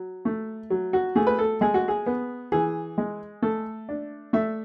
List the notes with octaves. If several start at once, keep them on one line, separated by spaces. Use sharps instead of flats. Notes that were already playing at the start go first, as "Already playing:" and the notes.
Already playing: F#3
A3
F#3
F#4
A3 G#4
B4
A4
G#3 G#4
F#4
G#4
B3
E3 G#4
G#3
A3 A4
D4
A3 E5